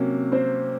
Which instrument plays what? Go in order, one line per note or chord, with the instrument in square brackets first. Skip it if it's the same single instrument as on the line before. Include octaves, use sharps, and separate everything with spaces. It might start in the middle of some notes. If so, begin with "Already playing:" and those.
Already playing: [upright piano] C3 F#3 A#3 C#4
C4 C5